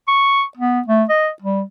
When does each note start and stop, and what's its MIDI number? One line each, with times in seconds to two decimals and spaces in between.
0.08 0.43 85
0.57 0.81 59
0.87 1.04 57
1.09 1.30 75
1.42 1.62 55